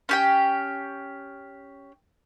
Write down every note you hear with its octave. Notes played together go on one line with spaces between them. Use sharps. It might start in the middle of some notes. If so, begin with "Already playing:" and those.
C#4 G4 G5